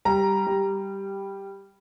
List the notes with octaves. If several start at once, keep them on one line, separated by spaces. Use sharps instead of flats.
G3 A#5
G3